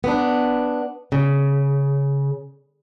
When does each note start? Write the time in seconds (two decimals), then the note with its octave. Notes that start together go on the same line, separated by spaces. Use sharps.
0.04 B3 D4
1.12 C#3